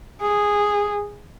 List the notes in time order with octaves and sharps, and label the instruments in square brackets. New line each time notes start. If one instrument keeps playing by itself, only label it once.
[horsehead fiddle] G#4